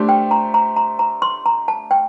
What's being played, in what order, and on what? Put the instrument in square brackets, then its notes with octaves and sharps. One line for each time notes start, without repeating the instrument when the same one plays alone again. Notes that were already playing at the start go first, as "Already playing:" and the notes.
Already playing: [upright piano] A3 D4 G4 C5
[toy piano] G5
A#5
A#5
A#5
A#5
C6
A#5
A5
G5